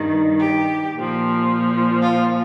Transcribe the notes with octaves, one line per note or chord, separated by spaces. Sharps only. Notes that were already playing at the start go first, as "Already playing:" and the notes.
Already playing: G2 D#3 G3
G4
A#2 F3
F4